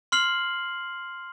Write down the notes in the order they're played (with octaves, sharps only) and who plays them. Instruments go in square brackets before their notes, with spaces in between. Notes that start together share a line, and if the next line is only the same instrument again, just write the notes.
[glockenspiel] C6 F6 C7 F#7